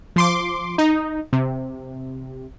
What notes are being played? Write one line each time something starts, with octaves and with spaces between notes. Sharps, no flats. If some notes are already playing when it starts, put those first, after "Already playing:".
F3 C6 D6
D#4
C3